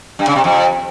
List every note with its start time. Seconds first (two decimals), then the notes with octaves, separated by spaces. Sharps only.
0.19 G2
0.27 C#3
0.36 C3
0.44 F2